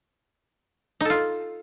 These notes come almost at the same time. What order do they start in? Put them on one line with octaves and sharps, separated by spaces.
D#4 A4 F4